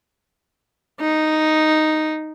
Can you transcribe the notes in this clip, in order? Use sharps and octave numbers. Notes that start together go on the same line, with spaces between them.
D#4